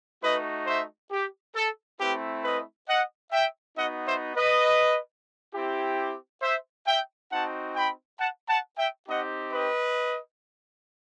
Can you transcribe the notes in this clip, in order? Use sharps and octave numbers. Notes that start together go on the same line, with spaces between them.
A3 D#4 F#4 B4 D#5
C5 E5
G4
A4
A3 C4 E4 G4 B4
B4 D#5
D#5 F#5
E5 G5
B3 D#4 F#4 D#5 F#5
C5 E5
B4 D#5
C4 E4 G4
C5 E5
E5 G5
C4 D#4 F#4 F#5 A5
G5 B5
F#5 A5
F#5 A5
E5 G5
C4 D#4 G4 D#5 F#5
B4 D#5